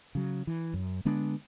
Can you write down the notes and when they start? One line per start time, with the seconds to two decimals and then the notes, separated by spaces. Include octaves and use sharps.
0.15 C#3 F#3
0.47 E3
0.74 F#2
1.05 D3 G#3 B3 D4